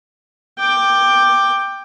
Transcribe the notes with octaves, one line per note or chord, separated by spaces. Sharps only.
G5 D6